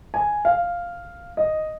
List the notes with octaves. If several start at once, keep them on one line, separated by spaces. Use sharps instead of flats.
G#5
F5
D#5